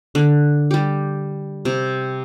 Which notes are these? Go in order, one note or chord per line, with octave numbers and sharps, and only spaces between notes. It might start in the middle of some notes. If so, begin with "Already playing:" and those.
D3
G3 G4
C3